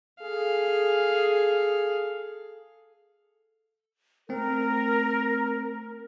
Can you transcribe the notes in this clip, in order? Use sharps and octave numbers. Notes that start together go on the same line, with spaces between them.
G#4 A4 F5
A3 C4 A#4